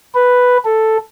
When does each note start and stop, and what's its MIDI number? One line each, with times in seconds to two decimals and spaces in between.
0.15 0.57 71
0.65 0.98 69